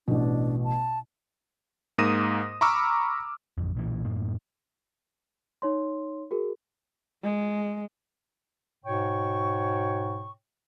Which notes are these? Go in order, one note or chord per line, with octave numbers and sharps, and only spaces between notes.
A1 B2 D4
A5
G#2 A#3 D#6 A#6 D#7 E7
A#5 B5 C#6 D6 E6 F6
A1 F2
B1 A#2 E3
F#2 A2 A#3
D#4 C#5 C6
F#4 G#4 A#4
G#3
G#2 B2 C#5 G5 C#6